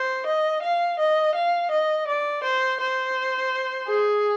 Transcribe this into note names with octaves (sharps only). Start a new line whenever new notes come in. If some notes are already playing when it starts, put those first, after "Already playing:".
Already playing: C5
D#5
F5
D#5
F5
D#5
D5
C5
C5
G#4